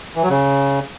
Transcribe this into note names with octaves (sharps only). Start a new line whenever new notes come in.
E3
F#3
C#3